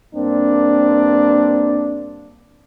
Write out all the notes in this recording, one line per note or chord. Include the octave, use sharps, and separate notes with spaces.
G2 A#3 C4 D4